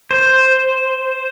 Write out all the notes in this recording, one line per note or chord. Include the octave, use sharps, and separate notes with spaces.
C5